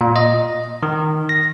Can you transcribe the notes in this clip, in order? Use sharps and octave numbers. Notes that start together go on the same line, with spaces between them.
A#2
D#5
D#3
A#6